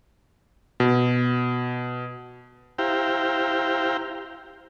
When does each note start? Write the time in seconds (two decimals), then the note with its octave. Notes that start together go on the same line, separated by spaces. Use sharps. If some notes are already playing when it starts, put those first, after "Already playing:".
0.80 B2
2.78 E4 G4 C5 F5 G5 A#5